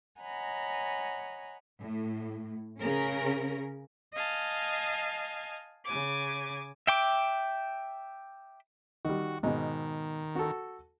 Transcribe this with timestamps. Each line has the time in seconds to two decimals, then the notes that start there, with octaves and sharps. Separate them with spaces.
0.21 C#5 D#5 F#5 G#5 A#5 B5
1.81 A2
2.81 C#3 C#4 A#4
4.13 D#5 F5 G#5 A5
5.85 C#3 G#5 D6
6.87 E5 G5 D6
9.05 D#3 G3 F#4
9.43 G#2 B2 D#3
10.35 F#4 A4